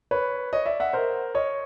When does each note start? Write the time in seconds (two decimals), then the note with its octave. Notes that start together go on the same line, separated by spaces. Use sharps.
0.11 B4 C#5
0.53 C#5 D#5
0.66 D5 E5
0.80 E5 F#5
0.93 A#4 C5
1.35 C#5 D#5